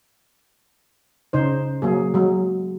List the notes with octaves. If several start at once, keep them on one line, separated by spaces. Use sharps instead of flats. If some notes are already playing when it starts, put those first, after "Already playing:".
C#3 D#4 C5
F#3 A#3 G#4
F#3 G#3